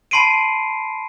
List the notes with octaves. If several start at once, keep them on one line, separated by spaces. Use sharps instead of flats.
A5 B5 C6 C7 D7 D#7